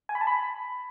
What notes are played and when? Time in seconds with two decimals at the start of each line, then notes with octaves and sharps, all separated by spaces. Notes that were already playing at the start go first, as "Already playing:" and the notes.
0.09 G#5
0.15 B5
0.21 A5
0.27 B5